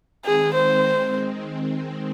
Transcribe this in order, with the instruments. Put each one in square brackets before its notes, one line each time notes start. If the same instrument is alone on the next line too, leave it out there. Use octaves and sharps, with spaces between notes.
[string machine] D#3 G#3 C4 [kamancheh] G#4
[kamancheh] C5